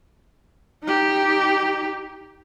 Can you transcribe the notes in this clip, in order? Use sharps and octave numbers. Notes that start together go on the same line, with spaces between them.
D#4 G4